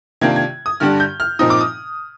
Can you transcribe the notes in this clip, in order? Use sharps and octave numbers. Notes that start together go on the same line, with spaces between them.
C3 D#3 A#3 D4 F4 G#6
G#6
D#6
G2 D3 G3 D4 F6
G6
F6
A#2 F3 C4 D#4 D#6
D6
D#6